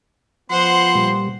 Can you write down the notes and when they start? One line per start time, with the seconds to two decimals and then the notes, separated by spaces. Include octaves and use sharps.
0.50 F3 B3 C5 F#5 C6
0.95 A#2 G3